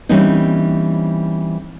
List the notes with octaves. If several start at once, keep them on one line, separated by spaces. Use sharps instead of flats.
E3 G3 A#3 C4 C#4 D#4